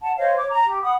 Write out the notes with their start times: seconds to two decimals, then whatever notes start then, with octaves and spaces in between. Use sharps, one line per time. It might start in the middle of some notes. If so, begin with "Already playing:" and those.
0.02 F#5 A5
0.17 C5 C#5 D#5 F5
0.36 C#5 D6
0.51 A#5
0.67 G4
0.82 F#5 B5 D#6